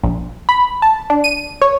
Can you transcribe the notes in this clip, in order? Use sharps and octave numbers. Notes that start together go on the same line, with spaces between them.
A#1
B5
A5
D4
D#7
C#5